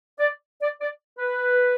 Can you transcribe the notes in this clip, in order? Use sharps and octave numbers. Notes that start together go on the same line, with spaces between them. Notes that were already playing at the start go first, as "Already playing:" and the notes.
D5
D5
D5
B4